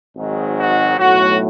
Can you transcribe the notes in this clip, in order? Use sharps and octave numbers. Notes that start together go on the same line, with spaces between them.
G#1 G#2 D#3 F#3
F#4
B1 A2 F#3 A3 F#4